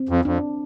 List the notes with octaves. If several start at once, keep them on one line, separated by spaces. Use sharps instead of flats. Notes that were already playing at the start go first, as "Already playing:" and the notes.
Already playing: C4
F2
F2 D4